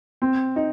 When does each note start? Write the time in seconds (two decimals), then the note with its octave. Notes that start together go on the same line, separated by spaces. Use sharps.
0.22 C4
0.56 D#4